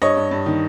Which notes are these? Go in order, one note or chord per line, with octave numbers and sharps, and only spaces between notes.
G2 C#5 D#5
G2
G2
D#3